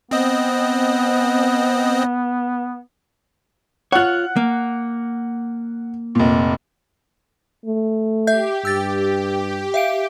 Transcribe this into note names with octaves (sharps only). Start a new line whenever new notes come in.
B3 C4 D#5
F4 C#5 F#5 F#6
A#3
F1 A#2
A3
G4 E5 G6
G2 E6 A6
E5 F5 D7